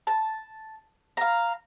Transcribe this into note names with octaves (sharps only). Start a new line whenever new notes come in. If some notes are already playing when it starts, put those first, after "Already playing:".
A5
F5 A#5